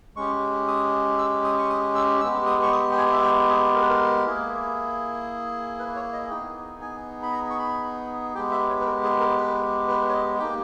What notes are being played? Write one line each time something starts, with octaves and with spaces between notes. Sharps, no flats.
G#3 C#4 G4 C#6
D#6
E6
D#6
C#6
D#6
E6
G#3 B3 G4 E6
D#6
C#6
D#6
G5
G#5
E5
G5
G#4
A#4
B4
A#4
A#3 E4 G#4
B4
C#5
D#5
B3 D#4 G#4 G5
G#5
B5
A#5
C#6
B5
G#3 B3 G4 G5
E5
C#5
B4
A#4
G#4
A#4
B4
B4
C#5
D#5
A#3 D#4 G4 G5